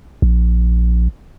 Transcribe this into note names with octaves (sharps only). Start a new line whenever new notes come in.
A#1